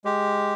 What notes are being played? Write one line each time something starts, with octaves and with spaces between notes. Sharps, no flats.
G#3 G4